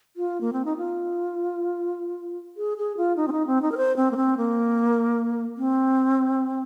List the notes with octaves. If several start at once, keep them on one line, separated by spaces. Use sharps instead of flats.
F4
A#3
C4
D#4
F4
G#4
G#4
F4
D#4
C4
D#4
C4
D#4
A#4
C5
C4
A#3
C4
A#3
C4